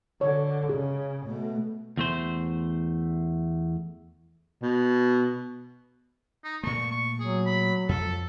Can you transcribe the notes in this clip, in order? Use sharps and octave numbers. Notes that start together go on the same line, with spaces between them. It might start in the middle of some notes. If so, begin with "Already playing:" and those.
D3 C#5
C#3 C#4 G#4
B2 A3
E2 A3 C5
B2
D#4
A#2 A3 C#6
C#6
F#3 G#4
B5
F2 A4